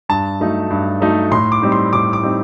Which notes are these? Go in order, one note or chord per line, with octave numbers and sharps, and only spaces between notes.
G2 A5
F#3 A3 D#4
G2
F#3 A3 D#4
A2 C6
D6
G3 C4 D#4
C6
A2 D6
D6
G3 C4 D#4